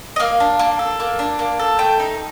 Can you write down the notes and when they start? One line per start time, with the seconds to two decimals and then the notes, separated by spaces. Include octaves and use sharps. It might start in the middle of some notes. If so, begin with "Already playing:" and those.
0.16 D#5
0.20 A#3 F5
0.40 D4
0.59 A#3
0.79 A4
1.00 A#3
1.19 D4
1.39 A#3
1.59 A4
1.79 A3 G5
2.00 D#4